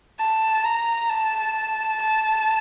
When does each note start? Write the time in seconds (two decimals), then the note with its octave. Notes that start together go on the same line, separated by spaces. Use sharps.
0.19 A5
0.65 A#5
1.10 A5
2.02 A5